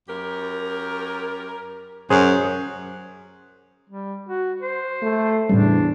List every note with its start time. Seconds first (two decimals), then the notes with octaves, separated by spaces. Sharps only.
0.08 F#2 G4 A#4
2.10 F#2 F#3 G#4 C5
3.90 G3
4.29 F#4
4.61 C5
5.02 A3
5.50 E2 A2 C#3 G3 D4